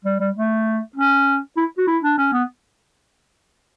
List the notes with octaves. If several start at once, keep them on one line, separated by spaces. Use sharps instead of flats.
G3
G3
A3
C#4
E4
F#4
E4
D4
C#4
B3